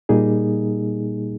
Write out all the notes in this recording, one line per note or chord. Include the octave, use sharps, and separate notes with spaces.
A#2 G3 A#3 D#4 G#4